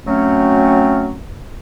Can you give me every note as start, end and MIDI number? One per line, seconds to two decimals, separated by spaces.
0.06 1.17 54
0.06 1.17 57
0.06 1.17 60
0.06 1.17 61